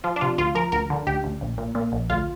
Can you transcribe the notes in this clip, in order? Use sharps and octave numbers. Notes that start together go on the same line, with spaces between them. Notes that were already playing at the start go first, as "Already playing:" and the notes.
F3 F4
D4
C3 F4
D2 F4
F3 A#4
D2 A#4
D3
D2 G4
D2
A#1
A#2
A#2
A#1
D2 F4